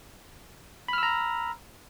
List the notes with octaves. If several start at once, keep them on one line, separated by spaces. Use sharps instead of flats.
A#5 B5 E6 F6